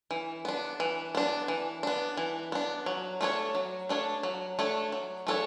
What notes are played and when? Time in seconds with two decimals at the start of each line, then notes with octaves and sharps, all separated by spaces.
0.11 E3
0.45 B3 D4
0.80 E3
1.15 B3 D4
1.48 E3
1.83 B3 D4
2.17 E3
2.52 B3 D4
2.86 F#3
3.21 A3 D4 A4 C#5
3.55 F#3
3.89 A3 D4 A4 C#5
4.23 F#3
4.59 A3 D4 A4 C#5
4.92 F#3
5.27 A3 D4 A4 C#5